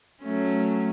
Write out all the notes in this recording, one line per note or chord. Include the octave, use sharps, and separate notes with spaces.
F#3 A3 C#4